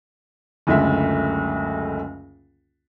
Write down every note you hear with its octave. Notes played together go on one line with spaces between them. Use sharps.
F#1 C#2 D3 A3 E5